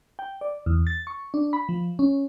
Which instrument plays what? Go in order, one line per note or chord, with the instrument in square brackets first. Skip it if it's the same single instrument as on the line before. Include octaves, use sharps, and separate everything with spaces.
[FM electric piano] G5
D5
E2
A6
C#6
D4
B5
F3
C#4